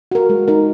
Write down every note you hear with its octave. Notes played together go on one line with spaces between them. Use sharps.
F#4 A#4
G#3
D#4 A#4